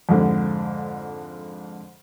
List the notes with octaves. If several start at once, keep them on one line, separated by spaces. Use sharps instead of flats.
F2 G#2 D3